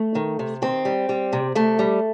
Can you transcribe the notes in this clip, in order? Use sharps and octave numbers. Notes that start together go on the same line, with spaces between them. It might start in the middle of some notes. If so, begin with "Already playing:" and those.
Already playing: A3
D#3
C3
D#3 C4
G3
G3
C3
C3 A3
G3